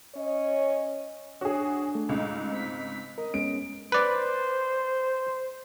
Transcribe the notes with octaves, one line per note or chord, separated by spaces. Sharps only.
C#4 C#5 D#5
D4 F#4 G#4 C#5 G#5
A3
C#2 G#2
C4 B6
A#4 D#5
G#3 B3 C#4 D7
B4 C5 D5